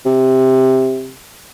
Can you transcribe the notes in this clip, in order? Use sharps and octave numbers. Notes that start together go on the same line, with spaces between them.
C3